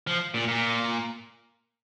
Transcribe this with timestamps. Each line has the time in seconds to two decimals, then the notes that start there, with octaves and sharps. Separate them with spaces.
0.07 F3
0.34 A#2
0.48 A#2